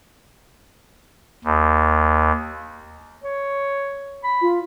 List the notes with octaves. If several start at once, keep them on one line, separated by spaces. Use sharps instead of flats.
D#2
C#5
B5
F4